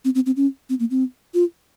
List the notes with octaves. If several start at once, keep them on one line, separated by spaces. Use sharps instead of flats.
C4
C4
C4
C#4
C4
A#3
C4
F4